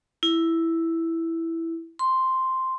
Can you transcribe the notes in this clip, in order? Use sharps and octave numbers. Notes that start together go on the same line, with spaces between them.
E4
C6